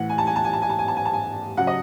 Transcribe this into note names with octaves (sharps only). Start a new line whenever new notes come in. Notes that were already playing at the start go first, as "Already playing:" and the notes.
Already playing: A2 E3 F#5
G#5
A5
G#5
A5
G#5
A5
G#5
A5
G#5
A5
G#5
A5
G#5
C#3 F#3 F#5
D#5